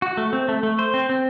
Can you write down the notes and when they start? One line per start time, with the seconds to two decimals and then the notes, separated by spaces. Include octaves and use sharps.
0.02 F#4
0.17 A3
0.33 C4
0.49 A3
0.63 A3
0.79 C5
0.94 C4
1.09 C4